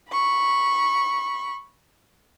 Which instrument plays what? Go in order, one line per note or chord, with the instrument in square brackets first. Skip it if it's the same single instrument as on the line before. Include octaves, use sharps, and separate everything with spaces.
[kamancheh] B5 C#6